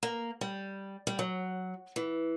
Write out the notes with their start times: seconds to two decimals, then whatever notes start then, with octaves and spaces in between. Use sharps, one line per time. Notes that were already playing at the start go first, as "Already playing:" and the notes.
0.03 A#3
0.41 G3
1.07 G3
1.19 F#3
1.96 E3